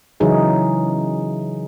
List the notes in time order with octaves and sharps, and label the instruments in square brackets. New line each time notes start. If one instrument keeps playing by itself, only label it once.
[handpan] C#3 E3 F#3 D#4 E4 G#4